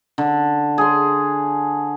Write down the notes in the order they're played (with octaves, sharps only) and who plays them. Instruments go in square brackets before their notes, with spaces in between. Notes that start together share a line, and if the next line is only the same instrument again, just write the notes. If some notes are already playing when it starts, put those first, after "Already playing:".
[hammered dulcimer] D3
G#4 C6